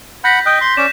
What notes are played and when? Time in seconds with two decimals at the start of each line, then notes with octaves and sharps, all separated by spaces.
0.24 F#5 B5 G6 A#6 B6
0.46 D#5 G5 F#6
0.61 C6
0.77 C#4 D5 E7